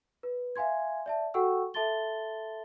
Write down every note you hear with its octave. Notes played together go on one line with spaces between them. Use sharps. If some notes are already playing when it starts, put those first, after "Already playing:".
B4
E5 F5 G#5 C6 G#6
D5 E5 A5
F#4 A4 F#5 G5 C#6 E6
A4 E5 A5 C6 A6 G7